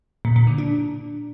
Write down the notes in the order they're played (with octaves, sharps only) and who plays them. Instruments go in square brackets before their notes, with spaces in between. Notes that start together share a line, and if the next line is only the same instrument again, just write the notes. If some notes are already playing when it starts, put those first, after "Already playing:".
[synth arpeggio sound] A#2
A#2
D3
D4